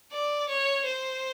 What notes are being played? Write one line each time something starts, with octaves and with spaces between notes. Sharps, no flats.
D5
C#5
C5